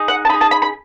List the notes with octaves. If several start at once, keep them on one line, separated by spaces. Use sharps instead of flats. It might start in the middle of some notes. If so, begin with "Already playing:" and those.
Already playing: D#4 G#4
F#5
A5
D#4 G#4 B5
A5
B5
B5